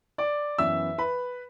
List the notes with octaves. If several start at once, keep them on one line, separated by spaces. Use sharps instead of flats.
D5 D6
F#2 E3 B3 E5 E6
B4 B5